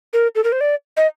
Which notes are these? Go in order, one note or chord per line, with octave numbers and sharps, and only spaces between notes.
A#4
A4
A#4
C5
D5
D#5